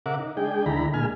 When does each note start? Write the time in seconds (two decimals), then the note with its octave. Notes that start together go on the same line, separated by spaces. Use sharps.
0.06 C#3 A#4 E5 F#5 D6
0.19 D#4
0.37 G#3 D4 G#4 G5
0.66 D2 D3 D#3 E4 A#5 B5
0.94 A#2 G#3 G#5 F6